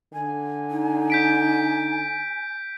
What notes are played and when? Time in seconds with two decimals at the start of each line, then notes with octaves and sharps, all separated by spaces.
0.13 D3 G#5
0.71 D#4
1.10 G6 B6 D7